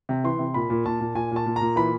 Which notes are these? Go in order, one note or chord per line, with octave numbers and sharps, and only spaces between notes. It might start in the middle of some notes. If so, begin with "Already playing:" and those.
C3
E3 C6
C3
A#2 B5
A#2
A#2 A5
A#2
A#2 G#5
A#2 A5
A#2
A#5
A#2
E3 B5